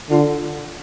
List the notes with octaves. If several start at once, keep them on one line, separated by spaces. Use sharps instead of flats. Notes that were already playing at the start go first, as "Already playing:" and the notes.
D3 F4